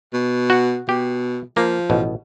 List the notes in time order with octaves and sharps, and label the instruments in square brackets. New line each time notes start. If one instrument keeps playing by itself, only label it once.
[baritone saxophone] B2
[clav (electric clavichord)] F#4 F#5
[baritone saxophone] B2 [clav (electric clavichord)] G4
[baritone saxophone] F3 [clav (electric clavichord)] A#3
[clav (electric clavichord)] A1 B2